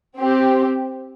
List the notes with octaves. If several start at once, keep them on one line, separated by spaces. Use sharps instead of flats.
C4 G4